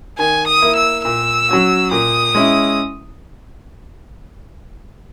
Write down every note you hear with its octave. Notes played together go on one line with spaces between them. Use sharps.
D#3 G#5
D#6
A#3 E4
E6
A#2 E6
F#3 C#4 F#4
A#2 D#6
G#3 C#4 E4